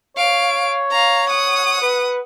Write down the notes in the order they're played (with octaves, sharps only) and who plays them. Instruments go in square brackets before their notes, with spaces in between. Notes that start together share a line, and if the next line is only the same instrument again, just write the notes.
[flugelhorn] C#5 [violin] F5 D7
[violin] F5 A#5
F#5 D#6
[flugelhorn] B4